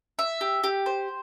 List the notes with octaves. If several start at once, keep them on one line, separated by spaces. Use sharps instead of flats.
E5
G4
G4
C5